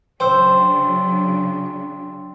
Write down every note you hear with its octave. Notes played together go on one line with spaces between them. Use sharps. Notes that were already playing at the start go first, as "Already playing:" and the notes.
C#3 F#3 D4 C5 G5 C6 E6